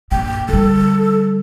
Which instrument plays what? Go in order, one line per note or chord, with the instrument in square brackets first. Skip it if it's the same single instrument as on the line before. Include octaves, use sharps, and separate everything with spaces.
[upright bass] G2 A#2 [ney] G5
[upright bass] D3 G3 [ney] A4